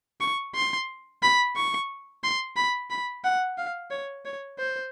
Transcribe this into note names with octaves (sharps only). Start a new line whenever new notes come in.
C#6
C6
B5
C#6
C6
B5
B5
F#5
F5
C#5
C#5
C5